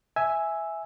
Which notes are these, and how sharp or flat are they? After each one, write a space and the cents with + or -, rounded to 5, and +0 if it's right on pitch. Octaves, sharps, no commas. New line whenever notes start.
E5 +0 G#5 +0 E6 +0